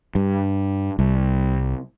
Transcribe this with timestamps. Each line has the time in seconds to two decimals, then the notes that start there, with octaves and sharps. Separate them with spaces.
0.15 G2
0.99 C2